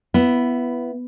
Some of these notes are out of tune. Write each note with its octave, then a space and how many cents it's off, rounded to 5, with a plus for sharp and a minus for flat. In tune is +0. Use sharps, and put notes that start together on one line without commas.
B3 +0 E4 +20